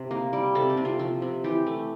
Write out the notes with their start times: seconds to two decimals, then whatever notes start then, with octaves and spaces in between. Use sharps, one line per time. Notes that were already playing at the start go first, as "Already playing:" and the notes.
Already playing: C3
0.11 A#3
0.33 G3
0.55 C3 A4
0.70 G4
0.77 C3
0.85 F4
0.99 F3
1.22 C3
1.44 E3 G4
1.66 A3